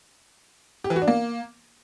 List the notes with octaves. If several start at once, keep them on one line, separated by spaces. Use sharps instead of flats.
G4
E3
F#4
D4
A#3